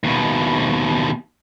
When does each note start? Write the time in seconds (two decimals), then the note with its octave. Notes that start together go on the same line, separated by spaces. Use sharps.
0.04 D#2 B2